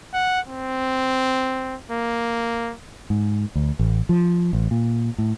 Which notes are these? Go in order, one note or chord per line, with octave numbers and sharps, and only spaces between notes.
F#5
C4
A#3
G#2
D2
A1
F3
A1
A#2
A2